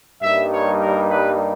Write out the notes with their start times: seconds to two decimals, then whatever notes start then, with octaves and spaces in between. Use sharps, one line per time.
0.21 G2 G3 A#3 D#4 E5
0.51 C#5
0.80 A#4
1.09 B4